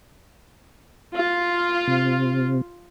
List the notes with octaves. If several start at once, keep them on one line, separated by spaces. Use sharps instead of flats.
F4
C3